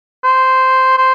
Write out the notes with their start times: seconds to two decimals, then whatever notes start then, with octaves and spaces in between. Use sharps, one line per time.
0.24 C5
0.98 C5